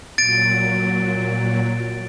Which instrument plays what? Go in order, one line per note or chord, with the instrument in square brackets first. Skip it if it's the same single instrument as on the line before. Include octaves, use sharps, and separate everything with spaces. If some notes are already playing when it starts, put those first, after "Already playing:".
[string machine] A#2 F#3 [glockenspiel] A6 D7